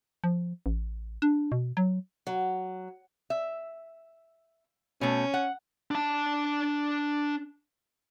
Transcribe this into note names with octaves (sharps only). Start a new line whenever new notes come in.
F3
A1
D4
B2
F#3
F#3
E5
B2 A3 C#4
F#5
D4 A5